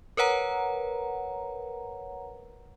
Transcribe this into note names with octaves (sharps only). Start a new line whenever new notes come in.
A#4 B4 C#5 F#5 A#5